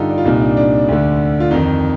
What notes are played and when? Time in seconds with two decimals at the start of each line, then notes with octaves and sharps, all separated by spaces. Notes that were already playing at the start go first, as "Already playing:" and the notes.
Already playing: G2 D3 D#4 F4 G4 A4
0.09 D4
0.18 F4
0.25 C2 A#2 D#4
0.41 D4
0.57 D4
0.88 D2 D3
1.40 F4
1.51 F2 D#3 D#4